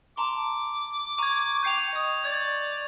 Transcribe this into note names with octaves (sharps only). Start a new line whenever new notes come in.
A5 A#5 C6 D6
A#5 C#6 G#6
G5 G6 C7 C#7 D#7 F7
D#5 D#6
D5 G#6